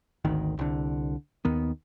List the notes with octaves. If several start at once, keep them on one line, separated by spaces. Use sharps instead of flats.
G#1 D2 D#3
C2 D3
D#2 D#3 B3